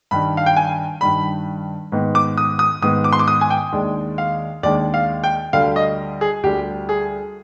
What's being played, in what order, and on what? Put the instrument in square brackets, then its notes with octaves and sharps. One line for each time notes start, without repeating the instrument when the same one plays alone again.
[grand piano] G2 D#3 G3 B5
F5
G5
G#5
G2 D#3 G3 B5
G#2 D#3 B3
D6
D#6
D#6
G#2 D#3 B3 D#6
D6
C6
D6
D#6
G#5
G5
D#2 D#3 G#3 D4
F5
D#2 D#3 G#3 D4 D5
F5
G5
D2 D3 G3 F5
D#5
G#4
D2 D3 G3 G4
G#4